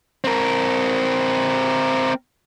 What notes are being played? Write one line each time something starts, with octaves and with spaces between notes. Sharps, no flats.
C4 A#4